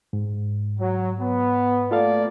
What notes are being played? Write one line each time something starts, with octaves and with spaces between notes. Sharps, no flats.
G#2
F#3
B3
A3 A#3 F4 A4 D5 F5